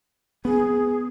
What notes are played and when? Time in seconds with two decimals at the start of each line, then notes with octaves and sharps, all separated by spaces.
0.45 B3 G#4